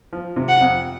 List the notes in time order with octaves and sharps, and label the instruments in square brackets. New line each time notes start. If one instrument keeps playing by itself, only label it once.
[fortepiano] F3
C3
[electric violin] F#5
[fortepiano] F2